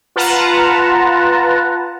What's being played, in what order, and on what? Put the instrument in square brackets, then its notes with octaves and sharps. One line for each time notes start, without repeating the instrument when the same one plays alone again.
[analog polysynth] F4 B4 F#5 A5 A#5